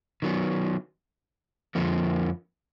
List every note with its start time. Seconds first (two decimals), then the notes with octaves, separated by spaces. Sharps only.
0.22 D#3 F#3 B3
1.75 F2 D3 F3 A#3